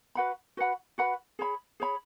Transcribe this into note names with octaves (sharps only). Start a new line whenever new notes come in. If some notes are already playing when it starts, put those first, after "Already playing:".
F#4 B4 F#5 B5
F#4 B4 F#5 B5
F#4 B4 F#5 B5
G#4 C#5 B5
G#4 C#5 B5